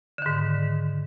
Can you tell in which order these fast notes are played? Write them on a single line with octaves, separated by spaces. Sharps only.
D3 D#3 G#2